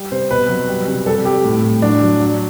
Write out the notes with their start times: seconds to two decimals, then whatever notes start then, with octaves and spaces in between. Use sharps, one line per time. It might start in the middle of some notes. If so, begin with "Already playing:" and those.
Already playing: G3
0.12 C3 C5
0.31 B2 B4
0.49 F#3
0.68 G3
0.88 C3
1.06 G3 A4
1.25 G3 G4
1.44 A2
1.63 A2
1.82 F#3 D4
2.02 F#3
2.21 F#3